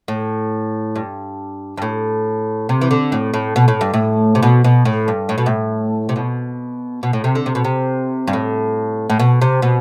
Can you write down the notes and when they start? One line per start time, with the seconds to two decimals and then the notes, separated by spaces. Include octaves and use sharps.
0.08 A2
0.96 G2
1.77 G2
1.82 A2
2.69 C3
2.81 E3
2.91 D3
3.12 A2
3.34 A2
3.56 B2
3.68 A2
3.81 G2
3.94 A2
4.35 C3
4.43 B2
4.64 B2
4.85 A2
5.08 G2
5.29 A2
5.38 B2
5.46 A2
6.09 C3
6.16 B2
7.03 B2
7.13 A2
7.24 C3
7.35 D3
7.46 C3
7.55 B2
7.65 C3
8.27 G2
8.33 A2
9.10 A2
9.20 B2
9.42 C3
9.62 B2